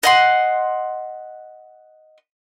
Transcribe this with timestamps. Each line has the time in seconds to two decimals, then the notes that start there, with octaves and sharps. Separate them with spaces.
0.03 D#5 F#5 C6